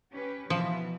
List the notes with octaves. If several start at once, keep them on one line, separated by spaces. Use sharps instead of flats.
C#4 G4 B4
B2 E3 F3